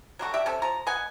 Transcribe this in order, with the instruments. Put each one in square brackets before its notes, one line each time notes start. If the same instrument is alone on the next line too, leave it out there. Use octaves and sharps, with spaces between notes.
[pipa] F#3 G3 F#4 A4
G4 D5 E5
C3 C#4 A4
F3 A#5
B4 D#5 F#5 G#5